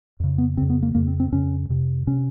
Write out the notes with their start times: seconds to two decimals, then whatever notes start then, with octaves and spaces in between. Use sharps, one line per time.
0.20 F2 C#3
0.38 B3
0.57 F2 C#3 C4
0.70 B3
0.82 A#3
0.95 F2 C#3 A#3
1.07 C4
1.20 C4
1.32 F2 C#3 C#4
1.69 F2 C3
2.07 C3 C#4